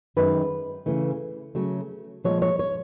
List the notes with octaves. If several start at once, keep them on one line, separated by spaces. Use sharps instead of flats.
F#2 D#3 G#3 B4
C#3 E3 A3
C#3 F#3 A3
A#2 F3 G#3 C#5
C#5
C#5